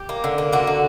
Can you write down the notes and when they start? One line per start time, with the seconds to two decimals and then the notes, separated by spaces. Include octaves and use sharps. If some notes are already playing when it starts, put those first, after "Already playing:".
Already playing: G4
0.09 A#3
0.24 D3
0.38 A#3
0.53 D3 F#4
0.67 D3